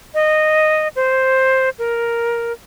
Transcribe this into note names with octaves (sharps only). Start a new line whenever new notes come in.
D#5
C5
A#4